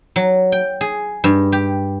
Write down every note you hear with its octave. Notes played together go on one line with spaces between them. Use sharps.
F#3
G5
G#4
G2
G4